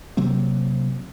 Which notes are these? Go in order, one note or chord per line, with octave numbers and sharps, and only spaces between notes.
C3 F#3 A#3 C4